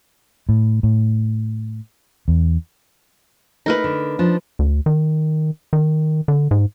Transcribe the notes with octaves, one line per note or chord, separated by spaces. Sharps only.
A2
A2
E2
A3 D#4 A#4 B4
D3
F3 D4
D2
D#3
D#3
D3
G#2